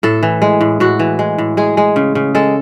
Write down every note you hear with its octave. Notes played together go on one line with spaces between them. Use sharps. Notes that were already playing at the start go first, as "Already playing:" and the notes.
A2 A4
E3
G#3
A2
A2 F#4
E3
G#3
A2
G#3 G#4
G#3
C#3
C#3
G#3 A4